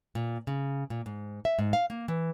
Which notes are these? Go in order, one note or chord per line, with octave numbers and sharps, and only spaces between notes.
A#2
C#3
A#2
G#2
E5
G#2
F5
A#3
E3